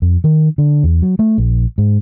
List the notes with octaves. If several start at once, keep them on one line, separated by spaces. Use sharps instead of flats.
F2
D#3
D3
E2
F#3
A3
A#1
G#2